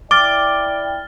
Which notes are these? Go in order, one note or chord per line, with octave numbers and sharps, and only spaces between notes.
E4 D5 G5 D6 F6 A6 G7